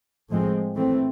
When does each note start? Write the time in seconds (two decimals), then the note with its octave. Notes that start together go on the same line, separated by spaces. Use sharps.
0.29 A2 F3 G#3 C4
0.76 E3 A3 C4